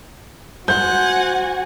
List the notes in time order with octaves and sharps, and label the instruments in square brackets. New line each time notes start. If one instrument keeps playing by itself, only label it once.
[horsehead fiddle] F#4 G#5 [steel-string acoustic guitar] C5 [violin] F#5 [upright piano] G6